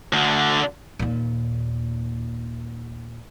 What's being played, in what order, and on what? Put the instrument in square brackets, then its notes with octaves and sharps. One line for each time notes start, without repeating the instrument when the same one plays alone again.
[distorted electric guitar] D2 D3
[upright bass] D#2 A#2